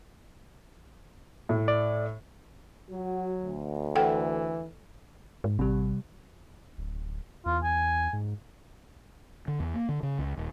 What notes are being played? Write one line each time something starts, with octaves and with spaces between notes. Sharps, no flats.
A2
D5
F#3 F#4
D2
E3 A4 F#5 G5
G#2
A1 C3 G3
D1
E2 F4
E2 G#5
G#2
D3
E2
A#3
D3
C#3
C#2
D#1